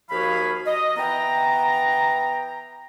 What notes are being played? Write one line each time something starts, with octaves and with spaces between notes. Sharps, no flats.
D#2 F3 F#4 G#4 F5 B5
D#5
E3 B3 G5 A#5